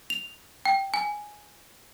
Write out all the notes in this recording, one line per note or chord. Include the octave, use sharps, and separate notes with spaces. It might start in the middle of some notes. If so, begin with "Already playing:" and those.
F7
G5
G#5